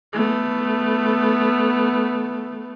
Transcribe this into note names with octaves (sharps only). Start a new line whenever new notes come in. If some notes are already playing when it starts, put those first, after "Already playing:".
A3 B3